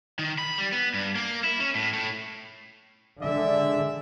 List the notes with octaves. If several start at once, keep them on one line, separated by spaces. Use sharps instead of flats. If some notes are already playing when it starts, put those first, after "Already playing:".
D#3
B5
G3
B3
G2
A#3
E4
C#4
A2
A2
D3 G#3 D5 E5